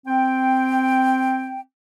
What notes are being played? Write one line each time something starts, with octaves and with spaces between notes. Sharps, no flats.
C4 G5